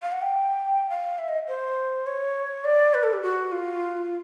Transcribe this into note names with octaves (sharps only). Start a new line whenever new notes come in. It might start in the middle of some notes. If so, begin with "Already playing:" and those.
F5
F#5
G5
F5
E5
D#5
C5
C#5
D5
B4
A4
G4
F#4
F4